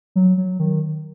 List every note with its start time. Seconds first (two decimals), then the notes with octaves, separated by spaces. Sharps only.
0.16 F#3
0.37 F#3
0.60 D#3